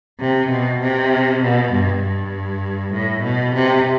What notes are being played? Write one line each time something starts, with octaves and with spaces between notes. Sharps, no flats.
C3
B2
C3
B2
G2
G2
A2
B2
C3